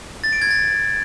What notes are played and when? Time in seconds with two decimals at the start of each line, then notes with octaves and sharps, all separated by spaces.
0.24 A6
0.33 D7
0.42 G#6
0.51 A6